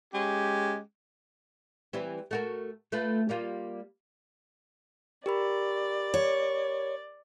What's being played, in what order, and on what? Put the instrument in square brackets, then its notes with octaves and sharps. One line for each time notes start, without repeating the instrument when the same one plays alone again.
[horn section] G#3 C#4 G4
[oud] E3 G3 C4
A3 F#4 A#4
A3 F4 B4
G3 A#3 F4
[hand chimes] G4 A#4 B5 [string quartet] D5
[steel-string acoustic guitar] C#5